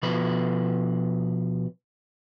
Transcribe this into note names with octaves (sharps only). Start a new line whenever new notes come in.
B2 F3 B4